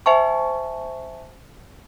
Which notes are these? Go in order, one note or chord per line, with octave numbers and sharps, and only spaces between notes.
C5 E5 G#5 A5 C#6